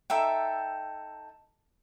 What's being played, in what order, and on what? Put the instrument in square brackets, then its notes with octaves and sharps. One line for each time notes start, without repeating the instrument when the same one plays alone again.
[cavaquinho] D#4 A4 E5 G5